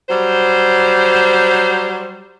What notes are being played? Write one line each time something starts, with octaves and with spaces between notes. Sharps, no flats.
F#3 G3 C5